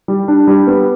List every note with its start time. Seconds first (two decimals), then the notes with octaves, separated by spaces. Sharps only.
0.08 G3
0.28 D4
0.47 G3
0.67 B3